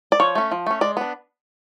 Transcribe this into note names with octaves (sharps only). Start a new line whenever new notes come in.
D5
F3 C#5
A3 C#4
F3
A3 C#4
G#3 D5
B3 D4